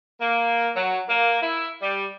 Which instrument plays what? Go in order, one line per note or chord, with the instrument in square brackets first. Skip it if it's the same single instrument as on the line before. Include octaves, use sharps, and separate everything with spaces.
[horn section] A#3
F#3
A#3
E4
G3